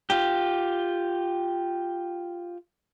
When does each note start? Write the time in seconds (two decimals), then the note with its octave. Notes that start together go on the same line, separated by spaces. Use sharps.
0.10 F4 G4